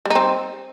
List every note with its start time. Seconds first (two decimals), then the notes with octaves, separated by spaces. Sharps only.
0.05 G3
0.10 D#4
0.15 C4